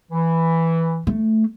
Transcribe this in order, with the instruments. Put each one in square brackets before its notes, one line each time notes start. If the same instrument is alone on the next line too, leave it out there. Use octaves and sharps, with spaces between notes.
[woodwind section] E3
[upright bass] A3